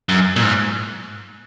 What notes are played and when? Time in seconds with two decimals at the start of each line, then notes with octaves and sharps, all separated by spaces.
0.09 F#2
0.36 A#2
0.42 G#2